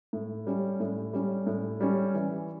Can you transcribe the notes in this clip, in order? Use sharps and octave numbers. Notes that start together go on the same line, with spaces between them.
A2
G3 C#4
A2
G3 C#4
A2
G3 C#4
E3